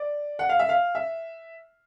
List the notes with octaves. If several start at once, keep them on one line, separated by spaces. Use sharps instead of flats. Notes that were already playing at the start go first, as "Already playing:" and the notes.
Already playing: D5
F#5
F5
E5
F5
E5